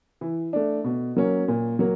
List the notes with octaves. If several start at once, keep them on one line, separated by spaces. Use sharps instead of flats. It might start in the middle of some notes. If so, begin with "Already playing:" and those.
E3
A3 D4
B2
F#3 A#3 C#4
A#2
F#3 A#3